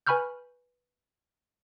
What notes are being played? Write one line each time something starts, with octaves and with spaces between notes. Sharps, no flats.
B4 G#5 B5 C#6 F6 G6